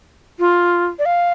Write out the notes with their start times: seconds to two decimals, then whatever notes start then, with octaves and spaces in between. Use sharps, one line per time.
0.39 F4
0.99 D5
1.06 F5